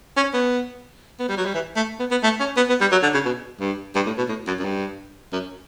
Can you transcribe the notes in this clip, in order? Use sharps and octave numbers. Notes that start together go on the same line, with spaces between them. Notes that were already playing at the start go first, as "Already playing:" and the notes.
C#4
B3
B3
G3
F#3
G3
E3
A3
B3
B3
A3
C#4
B3
B3
G3
F#3
D3
C#3
B2
G2
G2
A2
B2
A2
F#2
F#2
G2
F#2